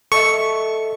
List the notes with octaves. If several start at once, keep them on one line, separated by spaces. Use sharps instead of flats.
A4 D#5 E5 C#6